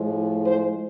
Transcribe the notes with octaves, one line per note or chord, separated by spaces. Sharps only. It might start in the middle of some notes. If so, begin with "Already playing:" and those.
Already playing: A2 F3 G#3
C5